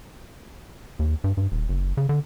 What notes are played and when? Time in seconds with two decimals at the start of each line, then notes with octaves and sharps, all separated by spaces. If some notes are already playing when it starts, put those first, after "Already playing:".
0.99 D#2
1.24 G2
1.37 G2
1.52 D#1
1.69 F#1
1.97 C#3
2.09 D3